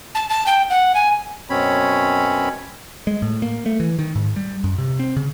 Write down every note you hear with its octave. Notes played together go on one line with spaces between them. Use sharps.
A5
A5
G5
F#5
G#5
F#2 B2 C4 C#4 C#5 B5
G#3
A2
A#3
A3
E3
D#3
G#2
G3
F#2
C3
C4
C#3